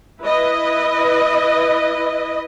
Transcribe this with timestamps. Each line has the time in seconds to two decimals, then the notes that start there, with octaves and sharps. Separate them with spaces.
0.22 E4 B4 D#5